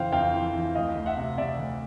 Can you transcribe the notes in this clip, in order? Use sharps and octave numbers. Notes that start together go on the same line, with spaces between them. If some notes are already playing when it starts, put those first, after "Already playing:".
Already playing: F2 C#3 E3 C5 F5 G5
F2 F5 G5
E3
E3
D2 D#5 F5
D2
E5 F#5
C3
C3 D5 E5
D2